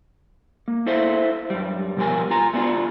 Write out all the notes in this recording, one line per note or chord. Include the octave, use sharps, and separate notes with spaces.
A#3
E4 A4 C5 E5 F5
F#2 G3
B2 F3 G3 G4 A#4 G#5
F4 G#5 A#5
A3 B3 C#4 D4 F4 F#4